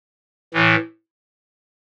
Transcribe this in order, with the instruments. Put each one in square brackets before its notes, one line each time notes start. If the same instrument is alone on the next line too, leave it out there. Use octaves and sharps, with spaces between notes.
[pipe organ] A2 E3